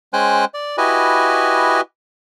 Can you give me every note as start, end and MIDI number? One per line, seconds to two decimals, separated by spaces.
0.13 0.45 56
0.13 0.45 61
0.13 0.45 72
0.13 0.45 79
0.13 0.45 80
0.13 0.45 90
0.54 0.76 74
0.78 1.81 64
0.78 1.81 66
0.78 1.81 67
0.78 1.81 71
0.78 1.81 75
0.78 1.81 80